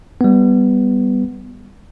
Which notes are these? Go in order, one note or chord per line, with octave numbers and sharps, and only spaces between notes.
G3 B3